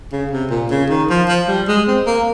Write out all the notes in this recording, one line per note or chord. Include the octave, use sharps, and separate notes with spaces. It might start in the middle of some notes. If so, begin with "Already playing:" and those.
C#3
C3
A#2
C#3
D#3
F3
F3
G3
G#3
C4
A#3